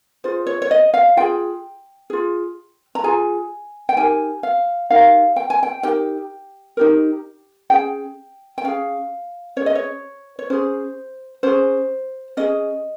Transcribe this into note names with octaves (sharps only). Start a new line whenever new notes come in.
F4 G#4 C5
C#5
C#5
D#5
F5
F4 G#4 G5
F4 G#4
A#5
F4 G#4 G#5
G5
D#4 G4 A#4 G#5
F5
D#4 G4 A#4 F5
G5
G#5
G5
D#4 G4 A#4 G5
D#4 G4 A#4
C#4 G#4 G5
G5
C#4 G#4 F5
C#4 G#4 C#5
D#5
C#5
C#5
C#4 G#4 C5
C#4 G#4 C5
C#4 G#4 D#5